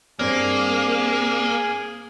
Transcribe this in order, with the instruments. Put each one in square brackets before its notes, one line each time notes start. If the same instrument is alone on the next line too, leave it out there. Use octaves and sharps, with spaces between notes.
[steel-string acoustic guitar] G2 C4 D5 [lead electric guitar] A#3 [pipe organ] G#4